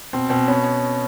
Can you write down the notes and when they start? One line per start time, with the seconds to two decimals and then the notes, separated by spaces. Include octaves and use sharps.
0.13 B2 C4
0.30 B2 C4
0.48 B3 C#4